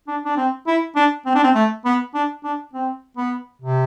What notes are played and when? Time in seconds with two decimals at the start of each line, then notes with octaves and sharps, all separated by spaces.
0.08 D4
0.25 D4
0.37 C4
0.67 E4
0.96 D4
1.26 C4
1.35 D4
1.44 C4
1.55 A3
1.85 B3
2.14 D4
2.44 D4
2.74 C4
3.17 B3
3.62 C3